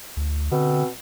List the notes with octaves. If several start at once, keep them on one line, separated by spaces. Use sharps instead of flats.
D2
B2 D3 C4